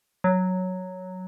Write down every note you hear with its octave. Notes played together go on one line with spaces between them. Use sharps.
F#3